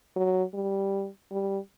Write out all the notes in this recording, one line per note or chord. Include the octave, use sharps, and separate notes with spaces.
F#3
G3
G3